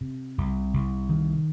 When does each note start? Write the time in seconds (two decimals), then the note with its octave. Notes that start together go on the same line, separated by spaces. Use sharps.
0.01 C3
0.38 C2
0.74 C2
1.09 D#3